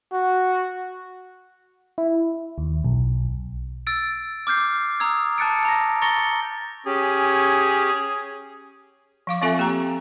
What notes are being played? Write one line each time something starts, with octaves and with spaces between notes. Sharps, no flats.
F#4
E4
D#2
B1
E6 A6 D7
D6 F6 G6 C7
A#5 D#6 E6 G#6
A5 F#6 A6 C#7 D7
A#5 A#6
A#5 C#6 A6 A#6 C#7 G7
C#4 G4 G#4
F3 F5 D6
F3 C4 F4 A4 E5 G#5
A#3 C4 G4 G5 A#5